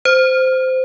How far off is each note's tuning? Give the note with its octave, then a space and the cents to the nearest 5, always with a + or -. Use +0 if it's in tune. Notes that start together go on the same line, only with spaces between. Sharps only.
C5 -15